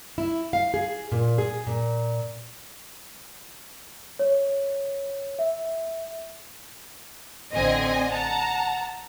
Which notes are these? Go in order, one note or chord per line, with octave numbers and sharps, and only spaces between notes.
E4
F5
G#4
A#2
G#4
A#2
C#5
E5
A1 D3 C4 D#5 G#5
F#5 A5 A#5